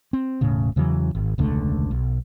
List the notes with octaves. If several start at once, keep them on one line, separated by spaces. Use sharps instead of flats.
C4
E1 A2 C#3
E2 C#3 E3 F#3
G#1
E1 C#2 D3 A3
B1